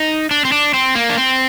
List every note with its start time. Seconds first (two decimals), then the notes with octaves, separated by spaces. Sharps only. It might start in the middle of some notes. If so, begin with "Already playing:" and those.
Already playing: D#4
0.31 D4
0.45 C4
0.52 D4
0.74 C4
0.96 A#3
1.09 D4
1.18 C4